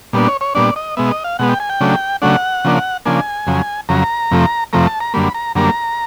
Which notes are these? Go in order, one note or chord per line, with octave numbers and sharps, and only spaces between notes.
A#2 G3 B3 D4
C#5
C#5
A#2 G3 B3 D4 D5
D#5
B2 G#3 B3 E5
D#5
F5
B2 G#3 B3 F#5
G5
G#5
G5
C#3 F#3 A3 D4
C#3 F#3 A3 D4 F#5
C#3 F3 A#3 D4
C#3 F3 A#3 D4 G#5
F2 C#3 F#3
F2 C#3 F#3 A#5
F2 C3 F3 A3
F2 C3 F3 A3 A#5
A5
A#5
F#2 D3 G3 A#3 B5
A#5
F#2 D3 G3 A#3 A#5